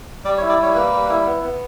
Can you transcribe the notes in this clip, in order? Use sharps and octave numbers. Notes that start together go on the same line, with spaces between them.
G3 D5
C#5
E4
D5
G3 C#5
A#3 B4
G3
E4
B3
B3